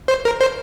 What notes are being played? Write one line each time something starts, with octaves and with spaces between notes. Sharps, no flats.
C5
A#4
C5